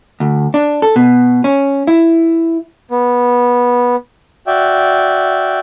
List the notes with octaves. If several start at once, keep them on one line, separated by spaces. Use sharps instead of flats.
D2
D4
A4
B2
C#4
E4
B3
F#4 D5 E5 G5